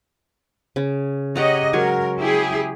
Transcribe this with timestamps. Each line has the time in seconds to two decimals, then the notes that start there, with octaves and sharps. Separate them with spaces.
0.76 C#3
1.36 G4 C#5 D#5 F#5 A#5
1.73 F#3 G#3 A#4 C#5
2.17 E4 G4 G#4